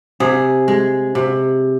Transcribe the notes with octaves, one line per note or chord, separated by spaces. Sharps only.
C3 G#4
G#3
C3